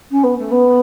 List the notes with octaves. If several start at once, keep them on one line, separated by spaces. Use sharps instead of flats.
C#4
B3
A3
B3